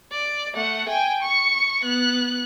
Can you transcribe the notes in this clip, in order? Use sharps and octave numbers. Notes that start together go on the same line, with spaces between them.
D5
A3 F#5
G5 G#5
C#6 C#7
B3 F#6